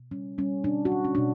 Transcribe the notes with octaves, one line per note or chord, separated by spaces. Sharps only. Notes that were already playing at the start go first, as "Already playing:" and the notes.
Already playing: B2
G3 C#4
G3 C#4
B2 D4
F#4
G3
C#4
B2 D4